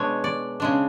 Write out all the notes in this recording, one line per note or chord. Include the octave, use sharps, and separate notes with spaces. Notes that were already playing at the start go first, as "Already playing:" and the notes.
Already playing: B2 G#3 D4 C#5
D5
C#3 G#3 D4